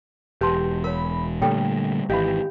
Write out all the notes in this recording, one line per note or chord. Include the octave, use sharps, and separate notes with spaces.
E1 G4 B4 A5 C6
A#4 C#5 B5
A#2 D3 G3 A3 A4 C#5 G5
G#1 E3 G4 D#5 F5 B5